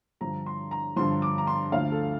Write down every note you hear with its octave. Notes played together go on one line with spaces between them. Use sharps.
G2 D3 F3 A#5
C6
A#5
G2 D3 F3 C6
D6
A#5
C6
D2 D3 F3 F5
A4